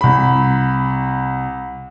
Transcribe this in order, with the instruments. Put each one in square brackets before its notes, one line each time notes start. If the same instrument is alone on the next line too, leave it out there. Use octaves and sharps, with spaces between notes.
[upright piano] C2 B5